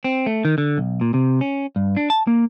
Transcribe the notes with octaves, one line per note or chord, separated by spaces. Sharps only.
C4
A3
D#3
D3
B1
A#2
C3
C#4
G2
D4
A5
A#3